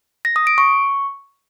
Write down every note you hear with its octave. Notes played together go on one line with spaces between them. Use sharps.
A#6
D#6
D7
C#6